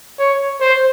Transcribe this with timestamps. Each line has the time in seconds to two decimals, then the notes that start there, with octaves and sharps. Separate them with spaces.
0.19 C#5
0.61 C5